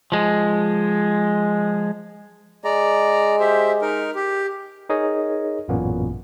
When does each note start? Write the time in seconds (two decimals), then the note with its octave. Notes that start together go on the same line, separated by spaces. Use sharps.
0.12 F3 G#3
2.64 G#3 D5 A#5
3.40 G4 C5 E5
3.82 D#4 A#4
4.15 G4
4.89 D#4 G#4 A#4 C#5 D#5
5.68 A1 F#2 A#2 A#3 B3 C#4